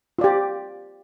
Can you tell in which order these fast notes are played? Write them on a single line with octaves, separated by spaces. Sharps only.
F4 D5 G4